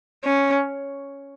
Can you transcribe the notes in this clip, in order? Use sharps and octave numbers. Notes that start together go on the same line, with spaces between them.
C#4